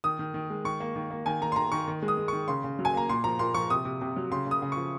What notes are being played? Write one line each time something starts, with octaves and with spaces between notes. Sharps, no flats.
D#3 D#6
D#3
D#3
G#3
D#3 C#6
A#3
D#3
A#3
D#3 G#5
D#3 A#5
C6
D#3 A#5
D#3 C#6
D#3
G#3
D#6
G#3
D#3 C#6
C#3 C6
C#3
F#3
G#5
A#3 A#5
A#2 C6
F3 A#5
A#2 C6
F3 C#6
C3 D#6
C3
C3
F#3
C#3 C6
C#3 D#6
C#3
F3 C#6